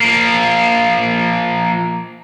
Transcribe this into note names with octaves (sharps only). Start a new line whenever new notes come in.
F3 A#3